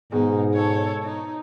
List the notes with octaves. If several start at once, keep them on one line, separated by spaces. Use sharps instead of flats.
G#2 B2 G#3 D#4
A4 C#5
D#4